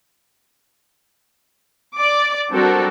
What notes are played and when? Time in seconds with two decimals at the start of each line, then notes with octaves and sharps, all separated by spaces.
1.96 D5 D6
2.50 G3 C4 D4 F#4 A4 A#4